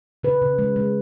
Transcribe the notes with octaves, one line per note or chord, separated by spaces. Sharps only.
C#3 B4
C#3
G#3
G#3